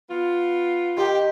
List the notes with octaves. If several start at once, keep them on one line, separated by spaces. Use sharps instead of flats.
B3 F4
D#3 G4 C6